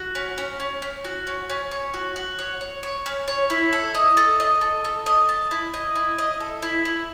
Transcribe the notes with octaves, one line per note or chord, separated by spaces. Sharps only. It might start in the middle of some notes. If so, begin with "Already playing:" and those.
Already playing: F#4
C#4
C#4
C#4
C#4
F#4
C#4
C#4
C#5
F#4
F#4
C#5
C#5
C#5
C#4
C#5
E4
A4
D#5
A4
D#5
A4
A4
D#5
A5
E4
D#5
E4
D#5
A4
E4
E4